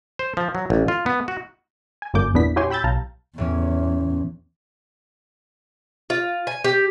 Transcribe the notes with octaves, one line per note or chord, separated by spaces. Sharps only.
C5
F3
F#3
A1
F4
B3
F#4
G#5
G1 F#2 D3 A#3 D6 G6
E2 A#2 B3 D4 E4 B6
E4 F#4 G4 C#5 G#5 C6
G5 B5 E6 G6 A6
B1 F5 A5 A#5
E2 A2 E3 C#4
F4
G#5
G4